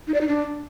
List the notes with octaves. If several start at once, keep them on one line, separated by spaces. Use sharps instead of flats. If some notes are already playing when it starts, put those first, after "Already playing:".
D#4
D5
D#4
D4